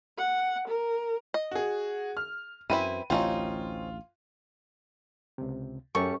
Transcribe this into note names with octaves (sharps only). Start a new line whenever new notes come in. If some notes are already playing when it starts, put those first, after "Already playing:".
F#5
A#4
D#5
F#4 G#4
F6
F#2 E3 C4 E4 D#7
A1 D2 C4 C#4 D#4 F4
C#2 C3
F#2 C#4 G4 A4 A#4 C#6